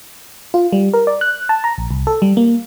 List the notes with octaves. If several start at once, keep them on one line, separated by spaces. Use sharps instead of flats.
F4
G3
A#4
D5
F#6
A5
A#5
A#1
C2
A4
G3
A#3